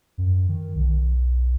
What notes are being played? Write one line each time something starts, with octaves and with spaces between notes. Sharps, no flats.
F#2
D#3
B1